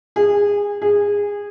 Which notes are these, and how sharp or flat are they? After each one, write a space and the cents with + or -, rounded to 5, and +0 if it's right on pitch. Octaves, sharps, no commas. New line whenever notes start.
G#4 -25
G#4 -20